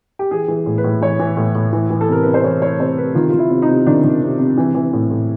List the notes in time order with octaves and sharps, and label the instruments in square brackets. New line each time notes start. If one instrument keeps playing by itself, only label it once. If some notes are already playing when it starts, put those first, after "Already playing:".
[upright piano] G4
E3 G#4
E3
A2
B4
A2
E3 C#5
E3
A2
A2
E3
E3
A4
C3 A#4
C3 B4
C5
E3 C#5
E3 C#5
C3 C5
C3 B4
D#3 F4
D#3 F4
E4
C3
D#4
C3
D#3 D4
D#3
C3
C3
E3
E3
A2
A2